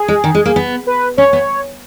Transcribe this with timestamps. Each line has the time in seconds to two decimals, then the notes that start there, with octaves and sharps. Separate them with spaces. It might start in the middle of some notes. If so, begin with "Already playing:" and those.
Already playing: G#4
0.08 G#3
0.24 D#3
0.35 G#3
0.46 A#3
0.56 B3
0.87 B4
1.17 C#4 C#5
1.33 B3